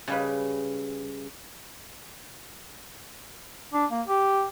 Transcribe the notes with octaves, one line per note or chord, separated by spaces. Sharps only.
C#3 G3 B4
D4
A#3
G4